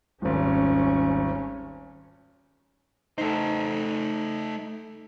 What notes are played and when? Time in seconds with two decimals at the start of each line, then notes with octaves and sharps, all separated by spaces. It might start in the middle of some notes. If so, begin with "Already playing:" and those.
0.22 D#1 G#1 C#4
3.18 A3 D#4 A4 C5